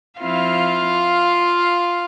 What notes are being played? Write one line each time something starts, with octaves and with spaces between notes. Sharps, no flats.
F3 C4 E4 F4 F5